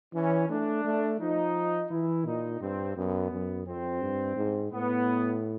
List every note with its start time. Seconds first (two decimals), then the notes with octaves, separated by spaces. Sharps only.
0.14 E3 C#4
0.49 A3 D4
0.84 A3
1.19 F3 D#4
1.90 E3 E4
2.25 A#2 D#4
2.61 G2 C4
2.96 F#2 B3
3.31 F#2
3.67 F2 C4
4.01 G2
4.36 G#2
4.71 A2 B3